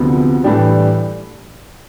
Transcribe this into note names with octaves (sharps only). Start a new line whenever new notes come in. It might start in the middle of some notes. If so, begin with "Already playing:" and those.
Already playing: D2 C3 F3 B3
A2 E3 G3 D4 G4